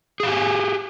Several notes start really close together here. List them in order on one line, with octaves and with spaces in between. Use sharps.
G#4 F5 G4 G#5